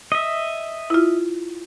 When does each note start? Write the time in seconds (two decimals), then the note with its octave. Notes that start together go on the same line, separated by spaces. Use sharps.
0.12 D#5 E5
0.90 E4 F4